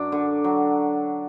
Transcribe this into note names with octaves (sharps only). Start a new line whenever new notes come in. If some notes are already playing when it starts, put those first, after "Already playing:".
Already playing: F#2 F#3 D4 D5
D3
F#3